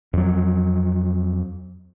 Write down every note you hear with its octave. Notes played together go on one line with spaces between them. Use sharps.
F2 F#3